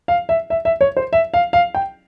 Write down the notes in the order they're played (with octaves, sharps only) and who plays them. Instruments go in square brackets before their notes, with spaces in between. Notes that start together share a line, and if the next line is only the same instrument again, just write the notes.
[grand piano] F5
E5
E5
E5
C#5
C5
E5
F5
F5
G5